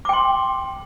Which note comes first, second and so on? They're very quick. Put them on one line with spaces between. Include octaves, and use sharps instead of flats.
D6 G5 C6